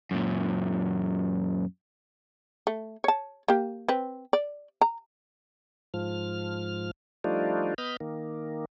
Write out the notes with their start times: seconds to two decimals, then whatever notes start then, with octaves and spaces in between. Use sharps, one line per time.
0.11 F#2 A#2
2.67 A3
3.04 C#5 A5
3.48 A#3 G4
3.89 C4 B4
4.33 D5
4.81 A#5
5.94 G#2 F3 F6
7.24 F3 G3 A3 D4 D#4 F4
7.78 B3 D#5 B5 F6 G6
8.00 D#3 A#3